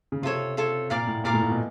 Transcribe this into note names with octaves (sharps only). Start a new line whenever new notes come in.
C#3
C3 F4 A4 C#5
F4 A4 C#5
A#2 D5 F5 A#5 D6
A2
A#2 D5 F5 A#5 D6
A2
A#2
B2